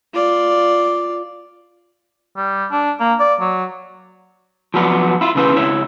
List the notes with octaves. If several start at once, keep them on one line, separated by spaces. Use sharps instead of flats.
F4 D5
G3
D4
A#3
D5
F#3
F3 F#3 B3 A#4 D5
E4 F4
B1 C#3 E3 G#4 B4 C5
C#2 E4 C#5 E5